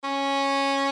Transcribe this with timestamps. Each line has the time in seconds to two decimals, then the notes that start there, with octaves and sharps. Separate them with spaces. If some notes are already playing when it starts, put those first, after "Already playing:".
0.04 C#4